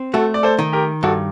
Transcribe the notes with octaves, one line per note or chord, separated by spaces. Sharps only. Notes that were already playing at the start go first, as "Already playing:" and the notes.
Already playing: C4
A3 F#4 A4
D5
A4 C5
D#3
G4 A#4
G2 F#4 A4